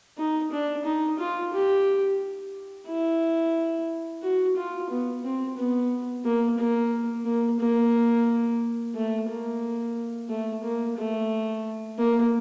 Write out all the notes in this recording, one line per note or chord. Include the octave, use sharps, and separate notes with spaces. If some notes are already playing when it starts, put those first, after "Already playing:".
D#4
D4
D#4
F4
G4
E4
F#4
F4
B3
C4
B3
A#3
A#3
A#3
A#3
A3
A#3
A3
A#3
A3
A#3